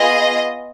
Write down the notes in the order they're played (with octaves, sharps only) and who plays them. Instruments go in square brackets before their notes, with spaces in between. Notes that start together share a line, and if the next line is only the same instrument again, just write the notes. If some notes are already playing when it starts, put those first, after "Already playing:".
Already playing: [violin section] B3 F4 G#4 D#5